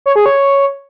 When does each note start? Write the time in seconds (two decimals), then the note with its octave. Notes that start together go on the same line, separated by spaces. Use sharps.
0.06 C#5
0.16 G#4
0.26 C#5